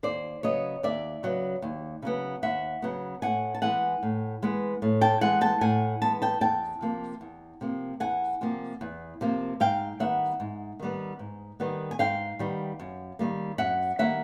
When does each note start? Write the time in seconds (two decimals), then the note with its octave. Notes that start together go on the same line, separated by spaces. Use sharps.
0.03 D#2 C5 D5
0.43 C#3 F#3 B3 C#5 D#5
0.83 D#2 D5 E5
1.23 C#3 F#3 B3
1.62 D#2
2.02 C#3 F#3 B3
2.42 D#2 E5 F#5
2.82 C#3 F#3 B3
3.22 A2 F#5 G#5
3.55 A5
3.62 E3 G#3 B3 F#5 G#5
4.03 A2
4.42 E3 G#3 B3
4.82 A2
5.01 G5 A5
5.21 E3 G#3 B3 F#5 G#5
5.41 G5 A5
5.61 A2 F#5 G#5
6.02 E3 G#3 B3 A5
6.22 G5 A5
6.41 E2 G5 A5
6.81 C3 F3 A#3
7.21 E2
7.61 C3 F3 A#3
8.00 E2 F#5 G#5
8.41 C3 F3 A#3
8.81 E2
9.21 C3 F3 A#3
9.60 G#2 F5 G5
10.00 D#3 G3 B3 E5 F#5
10.40 G#2
10.80 D#3 G3 B3
11.19 G#2
11.60 D#3 G3 B3
11.91 G#5
11.99 G#2 F5 G5
12.39 D#3 G3 B3
12.80 F#2
13.19 D#3 G3 A#3
13.58 F#2 E5 F#5
13.99 D#3 G3 A#3 E5 F#5